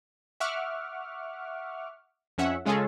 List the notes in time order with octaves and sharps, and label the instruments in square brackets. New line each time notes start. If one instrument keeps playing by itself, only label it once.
[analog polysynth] E5 F#5 C#6 D6 F6
F2 C#4 E5 F#5
C#3 G#3 C#4 F4 G#4 A4